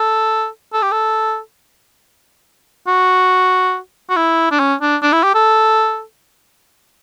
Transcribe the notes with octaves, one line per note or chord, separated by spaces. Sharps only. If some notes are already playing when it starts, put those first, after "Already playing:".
Already playing: A4
A4
G4
A4
F#4
F#4
E4
D4
C#4
D4
D4
E4
G4
A4